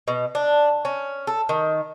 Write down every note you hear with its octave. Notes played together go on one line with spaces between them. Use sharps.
B2
D4
C#4
A4
D#3